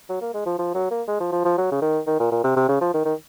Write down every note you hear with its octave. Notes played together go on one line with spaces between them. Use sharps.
F#3
A#3
G#3
F3
F3
F#3
A#3
G#3
F3
F3
F3
F#3
C#3
D#3
D#3
A#2
A#2
C3
C3
C#3
F3
D#3
D#3